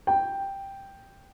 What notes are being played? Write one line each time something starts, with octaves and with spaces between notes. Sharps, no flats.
G5